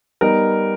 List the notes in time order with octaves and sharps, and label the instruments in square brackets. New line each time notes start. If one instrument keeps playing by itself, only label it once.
[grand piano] G3 B3 D#4 A#4